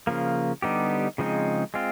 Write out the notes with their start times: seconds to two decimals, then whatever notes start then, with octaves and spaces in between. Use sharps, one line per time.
0.07 C#3 F3 A#3
0.62 D3 G3 B3 D#4 G4
1.18 C#3 F3 G#3 C4 D#4
1.74 G#3 C4 F4